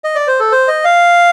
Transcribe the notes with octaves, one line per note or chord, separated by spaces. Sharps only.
D#5
D5
C5
A4
C5
D#5
F5